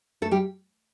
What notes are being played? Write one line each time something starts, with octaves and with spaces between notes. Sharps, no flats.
A3 A4
G3 G4